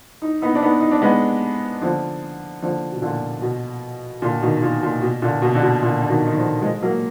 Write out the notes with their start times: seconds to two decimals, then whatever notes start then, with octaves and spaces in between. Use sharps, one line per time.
0.22 D#4
0.42 B3 D#4
0.55 D4
0.62 B3 D#4
0.81 D#4
0.91 D4
1.02 G#3 B3
1.82 D3 F3
2.62 D3 F3
2.92 B2
3.02 A#2 D3
3.42 B2
4.22 A#2 D3
4.42 B2 D#3
4.62 A#2
4.83 A#2
5.02 B2
5.22 A#2 D3
5.42 B2
5.55 D3
5.62 B2
5.82 A#2 D3
6.02 D3
6.09 B2 D#3
6.27 D#3
6.36 D3 F3
6.62 F3 G#3
6.82 F#3 A#3